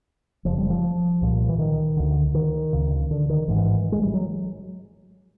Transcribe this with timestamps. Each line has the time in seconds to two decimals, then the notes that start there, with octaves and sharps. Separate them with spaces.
0.45 F1 F2 C#3 F3
0.58 G3
0.70 F3
1.21 C2 A#2
1.49 E3
1.59 D#3
1.97 D2 D3
2.34 D#3
2.73 D2 C#3
3.11 D3
3.30 D#3
3.48 A1 G#2 E3
3.92 G#3
4.03 G3
4.14 F#3